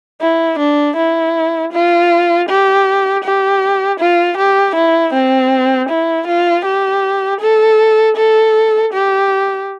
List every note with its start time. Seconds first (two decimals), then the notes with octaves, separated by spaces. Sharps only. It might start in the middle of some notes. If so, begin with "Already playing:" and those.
0.21 E4
0.59 D4
0.97 E4
1.73 F4
2.49 G4
3.24 G4
4.00 F4
4.37 G4
4.75 E4
5.14 C4
5.89 E4
6.27 F4
6.65 G4
7.41 A4
8.17 A4
8.93 G4